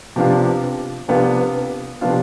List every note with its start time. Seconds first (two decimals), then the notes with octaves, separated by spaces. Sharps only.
0.16 C3 F3 B3 D4 F4
1.08 C3 F3 B3 D4 F4
2.01 C3 F3 B3 D4 F4